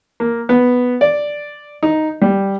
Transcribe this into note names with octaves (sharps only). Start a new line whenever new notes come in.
A#3
B3
D5
D#4
G3